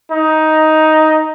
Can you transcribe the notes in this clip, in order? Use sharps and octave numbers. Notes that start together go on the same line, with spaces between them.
D#4